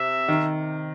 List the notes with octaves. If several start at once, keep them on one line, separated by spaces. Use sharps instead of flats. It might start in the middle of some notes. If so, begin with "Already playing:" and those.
Already playing: C3 E5
D#3